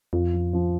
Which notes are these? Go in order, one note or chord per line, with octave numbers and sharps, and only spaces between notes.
F2 F4
F3
F3